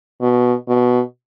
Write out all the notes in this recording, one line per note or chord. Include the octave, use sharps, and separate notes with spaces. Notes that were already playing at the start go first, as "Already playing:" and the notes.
B2
B2